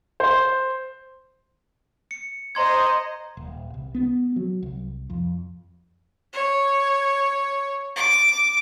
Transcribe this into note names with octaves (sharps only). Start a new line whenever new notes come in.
C5
C#7
C5 D#5 A#5 C6 G#6
D#1
C2
B3
F#3
C2
F2
C#5
D6